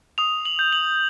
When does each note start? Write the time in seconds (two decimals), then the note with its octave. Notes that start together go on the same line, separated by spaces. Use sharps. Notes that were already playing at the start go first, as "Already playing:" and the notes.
0.18 D#6 F7
0.45 F#7
0.59 G6
0.72 F#7